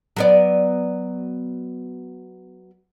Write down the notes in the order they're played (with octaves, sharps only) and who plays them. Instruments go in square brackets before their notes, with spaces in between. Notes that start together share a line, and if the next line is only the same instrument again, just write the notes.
[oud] F#3 B3 D5